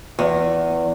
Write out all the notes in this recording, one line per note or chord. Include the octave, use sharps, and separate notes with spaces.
E2